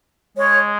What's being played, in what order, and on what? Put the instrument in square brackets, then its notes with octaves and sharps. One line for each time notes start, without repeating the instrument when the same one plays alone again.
[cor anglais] G#3 [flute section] C#5